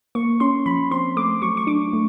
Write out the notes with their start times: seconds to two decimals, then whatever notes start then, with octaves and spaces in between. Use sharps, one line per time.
0.15 A#3 C#6
0.40 C#4 C6
0.66 F3 B5
0.91 C4 C6
1.17 A3 D6
1.42 F#3 C#6
1.57 C#6
1.67 D4 D6
1.93 A3